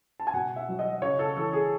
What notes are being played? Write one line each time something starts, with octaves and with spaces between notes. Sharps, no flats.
A5
G#5
B2 F#5
E5
F#3
D#5
C#3 C#5
A4
E3 A4
G#4